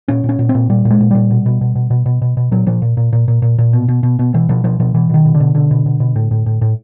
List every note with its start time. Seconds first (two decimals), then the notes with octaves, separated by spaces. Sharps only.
0.08 A#2 C#4
0.24 A#2
0.29 C#4
0.39 A#2
0.49 C4
0.55 A#2
0.70 A#2 G3
0.85 A#2
0.90 G#3
1.00 A#2
1.11 A#2 G3
1.31 B2
1.46 B2
1.61 B2
1.75 B2
1.90 B2
2.06 B2
2.22 B2
2.37 B2
2.51 A#2 F#3
2.67 A#2 F3
2.82 A#2
2.97 A#2
3.13 A#2
3.28 A#2
3.42 A#2
3.58 A#2
3.73 B2
3.88 B2
4.03 B2
4.19 B2
4.34 B2 E3
4.49 B2 F3
4.64 B2 F3
4.80 B2 F3
4.94 B2 E3
5.10 B2 D#3
5.25 B2
5.34 D3
5.40 B2
5.55 B2 D3
5.71 B2
5.86 B2
6.00 B2
6.16 A2
6.31 A2
6.46 A2
6.61 A2